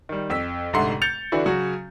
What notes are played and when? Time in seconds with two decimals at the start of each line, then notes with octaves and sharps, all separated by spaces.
0.09 D#3 G3
0.30 F2 E6 B6
0.73 F1 G#2 D3 E5 F#5 C6
1.02 G6 A6 C#7 F7
1.32 D3 E3 D4 E4 F#4
1.46 C#3 F#3 F#4